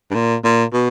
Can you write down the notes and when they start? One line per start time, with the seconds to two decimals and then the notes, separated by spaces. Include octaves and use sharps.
0.11 G2
0.15 A#2
0.44 A#2
0.73 B2